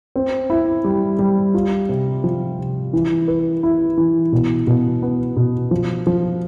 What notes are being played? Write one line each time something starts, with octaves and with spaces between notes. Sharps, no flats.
C4
E4
G3
G3
F4
C3
F3
C3
E3
B4
E4
E3
B2
B2
B3
B2
F3
F3